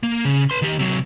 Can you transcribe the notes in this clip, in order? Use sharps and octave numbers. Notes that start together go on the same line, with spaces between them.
A#3
C#3
B4 C6
D#3 G4
C3 F#3